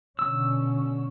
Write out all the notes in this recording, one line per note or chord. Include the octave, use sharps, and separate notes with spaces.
B2 D3 C#4 E6